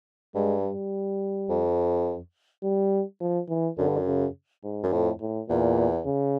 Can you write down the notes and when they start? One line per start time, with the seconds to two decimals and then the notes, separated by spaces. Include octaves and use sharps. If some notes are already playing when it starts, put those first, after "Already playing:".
0.35 G2 G#3
0.64 G3
1.50 F2
2.63 G3
3.21 F3
3.49 E3
3.78 F#2 D3
3.88 G2
3.97 F#2
4.07 C#3
4.64 G#2
4.83 F#2
4.93 F2 A2
5.21 A2
5.49 E2 A#2
6.06 C#3